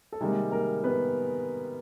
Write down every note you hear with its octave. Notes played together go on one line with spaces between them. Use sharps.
A4
C3 D#3 G3 G#3 A#3 G#4
A#3 A#4
B3 B4